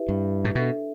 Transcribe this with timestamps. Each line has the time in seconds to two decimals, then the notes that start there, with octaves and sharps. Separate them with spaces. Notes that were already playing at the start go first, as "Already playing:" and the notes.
Already playing: E4 G4 B4 E5
0.09 G2
0.44 A2
0.55 B2 D4 A4 E5